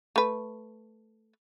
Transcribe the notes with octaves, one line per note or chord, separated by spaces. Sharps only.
A3 B4